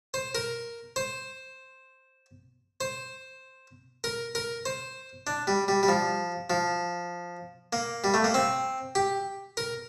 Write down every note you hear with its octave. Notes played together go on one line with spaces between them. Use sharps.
C5
A#4
C5
C5
A#4
A#4
C5
D4
G3
G3
G3
F3
F3
A#3
G3
A3
A#3
C4
G4
A#4